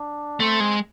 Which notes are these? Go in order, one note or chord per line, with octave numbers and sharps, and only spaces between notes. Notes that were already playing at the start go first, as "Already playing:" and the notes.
Already playing: D4
A3 C4
G#3